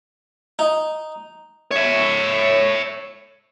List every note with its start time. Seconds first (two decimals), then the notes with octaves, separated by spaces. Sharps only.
0.59 D#4
1.71 C#5 E5